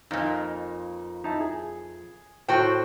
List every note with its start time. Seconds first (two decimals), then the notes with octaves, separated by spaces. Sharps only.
0.11 F2 A#2 D#4
1.24 D#4 E4 A5
1.41 G#4
2.48 A2 F#4 C5 G5